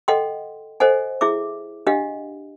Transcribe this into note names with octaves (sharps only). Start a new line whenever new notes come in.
A4 D#5 F#5 G5 C6
A4 C5 D#5 F#5 G#5
E4 G#4 E5 D6
D4 G4 D#5 F5 F#5